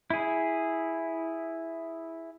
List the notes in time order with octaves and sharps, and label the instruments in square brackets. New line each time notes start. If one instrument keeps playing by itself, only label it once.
[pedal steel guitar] E4 G#4